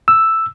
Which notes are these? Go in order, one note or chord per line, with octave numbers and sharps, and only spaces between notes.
E6